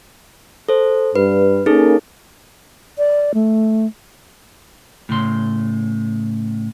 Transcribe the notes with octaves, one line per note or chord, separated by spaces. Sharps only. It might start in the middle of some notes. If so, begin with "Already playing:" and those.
A4 C5
G2 B4
A#3 C#4 D#4 G#4 A4
D5
A3
A2 C#3 C6